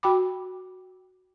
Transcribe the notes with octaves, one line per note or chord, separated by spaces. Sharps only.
F#4 G5 B5 D6